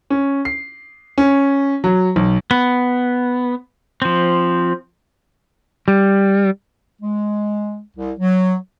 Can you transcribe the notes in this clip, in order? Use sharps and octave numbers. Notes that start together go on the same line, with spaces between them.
C#4
C7
C#4
F#3
B1
B3
F3 C4
G3
G#3
C2
F#3